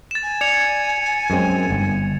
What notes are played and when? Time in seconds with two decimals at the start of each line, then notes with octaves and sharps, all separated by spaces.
0.11 A6 E7
0.23 G#5
0.41 D5 G#6 C#7 F7
1.30 F#2 G#3 C4
1.70 G1